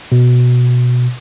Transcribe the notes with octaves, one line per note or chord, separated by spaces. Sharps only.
B2